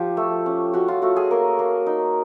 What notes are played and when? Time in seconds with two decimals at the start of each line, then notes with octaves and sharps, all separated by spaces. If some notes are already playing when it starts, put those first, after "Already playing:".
Already playing: F3 G4
0.17 A3
0.46 C#4
0.73 C#4 F#4
0.88 F4
1.02 A3 F#4
1.16 G#4
1.31 A#3 A#4
1.59 A#3
1.86 D#4